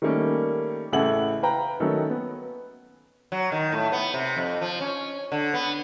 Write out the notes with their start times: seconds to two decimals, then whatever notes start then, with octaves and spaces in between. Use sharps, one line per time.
0.02 D#3 G3 A3 A#3 C#4
0.92 A1 C#3 E4 A4 F#5 F#7
1.43 B4 F5 G5 A#5
1.80 D#3 F#3 A3 C#4 D#4 A4
2.10 B3
3.32 F#3
3.52 D#3
3.72 A2
3.92 B3
4.14 C3
4.37 F2
4.61 F3
4.81 C#4
5.32 D3
5.54 B3